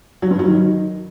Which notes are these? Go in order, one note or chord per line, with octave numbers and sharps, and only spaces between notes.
F#3
G2
F#3
D#3